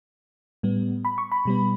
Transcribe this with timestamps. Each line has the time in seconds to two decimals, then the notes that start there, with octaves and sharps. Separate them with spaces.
0.63 A2 G3 B3
1.05 B5
1.18 C#6
1.32 B5
1.45 B2 G3 B3